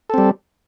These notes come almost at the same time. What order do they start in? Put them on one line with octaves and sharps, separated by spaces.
A4 C4 G3